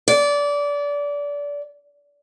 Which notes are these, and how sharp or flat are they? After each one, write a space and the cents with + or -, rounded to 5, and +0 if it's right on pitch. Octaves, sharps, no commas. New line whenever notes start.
D5 -25